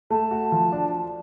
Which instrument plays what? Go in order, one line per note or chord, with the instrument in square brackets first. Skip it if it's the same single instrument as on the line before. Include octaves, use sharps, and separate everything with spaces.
[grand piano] A3 [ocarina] A5
[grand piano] F#4
F3
D4